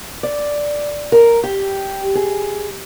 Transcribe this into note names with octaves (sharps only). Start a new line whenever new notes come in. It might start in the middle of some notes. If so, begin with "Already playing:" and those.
D5
A#4
G4
G#4